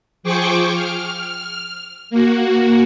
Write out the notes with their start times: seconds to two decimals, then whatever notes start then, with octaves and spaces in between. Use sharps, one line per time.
0.23 F3 G#4 C5 G5 C#6 D6
0.74 F6
2.10 A#3 F#4